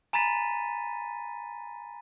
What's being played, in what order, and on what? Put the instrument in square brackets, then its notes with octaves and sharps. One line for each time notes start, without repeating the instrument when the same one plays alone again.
[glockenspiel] G#5 A#5 B5 A6 B6 D#7